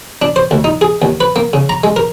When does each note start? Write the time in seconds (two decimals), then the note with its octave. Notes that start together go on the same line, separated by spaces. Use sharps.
0.22 D4
0.36 C5
0.51 D2
0.64 D#4
0.81 G#4
1.02 D#2
1.20 B4
1.36 A#3
1.53 C#3
1.69 A#5
1.84 G#3
1.96 A#4